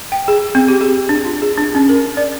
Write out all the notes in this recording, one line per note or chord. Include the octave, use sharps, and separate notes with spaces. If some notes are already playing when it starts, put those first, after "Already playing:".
G5
G#4
C4
G4
G#4
D4
F4
G#4
D4
C#4
A#4
D5